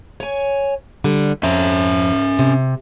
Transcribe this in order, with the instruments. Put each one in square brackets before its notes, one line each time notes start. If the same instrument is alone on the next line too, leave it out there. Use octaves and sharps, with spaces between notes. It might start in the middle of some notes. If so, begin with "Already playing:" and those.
[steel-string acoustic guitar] C#5 G#5
D3 G3
[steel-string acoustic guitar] F2 [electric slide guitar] C#4 E5
[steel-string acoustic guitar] C3